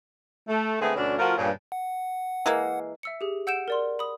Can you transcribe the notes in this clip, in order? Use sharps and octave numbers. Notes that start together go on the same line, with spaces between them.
A3
D3 G#3 A3 B3 C4 G#4
D2 B2 C#4 D4
F3 A3 F4 F#4 A#4
G2 A#2 C#3
F#5
E3 G#3 A#3
E5 E6 C#7
G4 G#4
F#5 E6 G6 C#7 D7 E7
A#4 D5 C6
B5 D#6